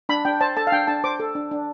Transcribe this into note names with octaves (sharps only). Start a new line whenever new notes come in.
D4 B5
D4 G5
C5 A5
A4 A5
F5
D4 G5
D4 A5
C5 D6
A4
D4
D4